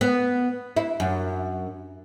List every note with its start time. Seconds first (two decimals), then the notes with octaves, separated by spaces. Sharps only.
0.01 B3
0.77 E4
1.00 F#2